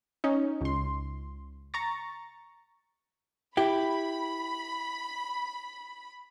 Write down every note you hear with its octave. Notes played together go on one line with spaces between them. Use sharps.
C#4 D#4
C#2 C6
A#5 C#6 A6
E4 G4 B5